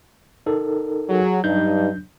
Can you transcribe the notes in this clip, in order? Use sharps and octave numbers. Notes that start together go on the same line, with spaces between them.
D#4 A4 A#4
F#3 G#4
G2 F#3 D4 D#4 G6